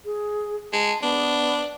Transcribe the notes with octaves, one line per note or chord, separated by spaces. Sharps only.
G#4
G#3 A5
B3 D4